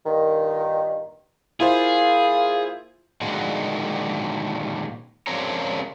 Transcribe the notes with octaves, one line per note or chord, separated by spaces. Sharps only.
G2 A#2 D#3
A#3 E4 F4 G#4 C5
A#2 D3 D#3 G#3 F#4
C#3 C4 D4 A#4 C#5 A#5